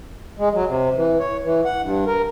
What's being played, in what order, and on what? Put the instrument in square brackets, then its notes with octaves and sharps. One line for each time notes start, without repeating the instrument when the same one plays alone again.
[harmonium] G#3
F#3
C3
E3
C#5
E3
F#5
G2
A#4